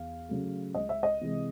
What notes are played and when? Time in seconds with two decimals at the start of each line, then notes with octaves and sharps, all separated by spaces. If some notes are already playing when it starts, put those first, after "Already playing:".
Already playing: E2 F5
0.29 C#3 F#3 A3
0.75 C#2 D#5
0.89 E5
1.03 D#5
1.21 C3 E3 G#3